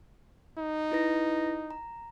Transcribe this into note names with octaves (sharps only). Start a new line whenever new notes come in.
D#4
E4 B4 A#6
A#5